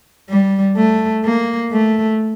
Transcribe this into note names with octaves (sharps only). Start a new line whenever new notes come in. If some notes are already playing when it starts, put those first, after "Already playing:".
G3
A3
A#3
A3